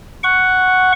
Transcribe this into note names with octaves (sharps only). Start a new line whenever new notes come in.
F#5 C#6